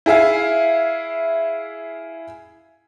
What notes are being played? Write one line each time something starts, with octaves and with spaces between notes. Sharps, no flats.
E4 G#4 E5 F5